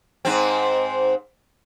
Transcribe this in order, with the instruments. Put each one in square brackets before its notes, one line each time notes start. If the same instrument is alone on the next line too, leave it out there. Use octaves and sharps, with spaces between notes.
[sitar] G#2 C4